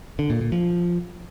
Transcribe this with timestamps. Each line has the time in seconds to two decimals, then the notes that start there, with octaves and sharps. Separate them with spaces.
0.19 D3
0.30 A#2
0.41 A#2
0.52 F3